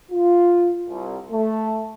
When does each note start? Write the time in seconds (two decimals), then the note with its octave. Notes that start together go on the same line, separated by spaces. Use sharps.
0.12 F4
0.89 C2
1.32 A3